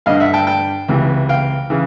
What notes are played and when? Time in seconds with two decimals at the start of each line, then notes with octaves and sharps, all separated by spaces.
0.06 G2 D3 D#5 F5
0.20 E5 F#5
0.33 G5 A5
0.47 G5 A5
0.88 C#2 C3 E3
1.29 F5 G5
1.70 C#3 E3